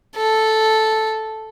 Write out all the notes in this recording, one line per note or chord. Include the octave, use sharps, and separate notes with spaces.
A4